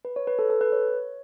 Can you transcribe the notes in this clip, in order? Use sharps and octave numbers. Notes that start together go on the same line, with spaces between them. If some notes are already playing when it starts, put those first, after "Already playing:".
B4
C#5
B4
A4
A4
B4
C#5